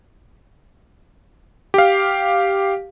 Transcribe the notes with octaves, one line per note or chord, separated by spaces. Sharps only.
G4 F5